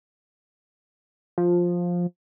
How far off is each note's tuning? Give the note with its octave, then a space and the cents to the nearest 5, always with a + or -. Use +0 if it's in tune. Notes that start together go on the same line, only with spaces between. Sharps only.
F3 +10